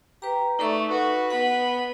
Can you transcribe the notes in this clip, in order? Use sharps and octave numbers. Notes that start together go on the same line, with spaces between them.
G4 B4 A#5
A3 D#4 A4 D5 C#6
F#4 B4
B3 F#5 B5